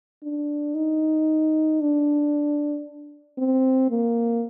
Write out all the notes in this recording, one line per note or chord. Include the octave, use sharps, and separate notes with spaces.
D4
D#4
D4
C4
A#3